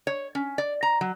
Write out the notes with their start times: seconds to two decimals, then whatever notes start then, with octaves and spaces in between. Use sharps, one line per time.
0.07 C#5
0.35 C#4
0.58 D5
0.83 A#5
1.01 F#3